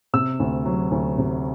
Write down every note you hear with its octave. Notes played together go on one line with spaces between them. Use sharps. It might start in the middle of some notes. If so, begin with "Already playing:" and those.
C3 E6
D2
F#3
D2
C3